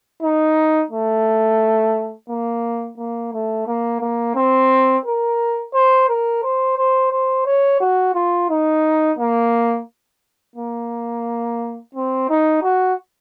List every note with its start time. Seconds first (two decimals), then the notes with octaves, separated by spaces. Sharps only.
0.22 D#4
0.91 A3
2.29 A#3
2.98 A#3
3.33 A3
3.67 A#3
4.01 A#3
4.35 C4
5.05 A#4
5.73 C5
6.09 A#4
6.43 C5
6.78 C5
7.11 C5
7.46 C#5
7.80 F#4
8.15 F4
8.50 D#4
9.19 A#3
10.56 A#3
11.94 C4
12.29 D#4
12.63 F#4